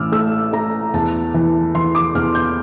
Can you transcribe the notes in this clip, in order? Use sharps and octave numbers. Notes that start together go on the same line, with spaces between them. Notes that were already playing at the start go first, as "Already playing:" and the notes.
Already playing: A1 E3 D6 E6 F6
A3 E6
A3 A#5
E2 A5
E3
E3 C6
D6
E2 F6
G6